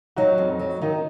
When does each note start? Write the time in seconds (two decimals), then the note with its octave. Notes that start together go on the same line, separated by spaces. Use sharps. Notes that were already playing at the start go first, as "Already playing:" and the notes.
0.16 F#3 D#4 F#4
0.38 F2
0.59 F#3
0.82 D#3 D#4